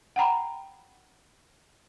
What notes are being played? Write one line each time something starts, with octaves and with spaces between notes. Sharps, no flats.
F#5 G5 A#5 B5